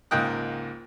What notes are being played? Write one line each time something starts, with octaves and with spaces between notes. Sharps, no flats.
C#2 G#2 A#3 G5 D#6 F#6